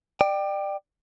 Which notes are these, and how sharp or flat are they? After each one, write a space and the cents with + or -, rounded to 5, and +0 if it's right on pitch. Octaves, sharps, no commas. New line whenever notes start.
D5 +30 G5 +0